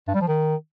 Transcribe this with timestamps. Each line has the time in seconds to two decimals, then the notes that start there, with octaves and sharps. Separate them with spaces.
0.08 G2
0.14 G3
0.21 F3
0.28 D#3